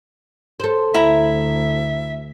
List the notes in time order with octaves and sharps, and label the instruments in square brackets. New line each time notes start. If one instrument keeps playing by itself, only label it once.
[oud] A4 C5
[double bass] D2 [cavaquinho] E4 A#5 [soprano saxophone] E5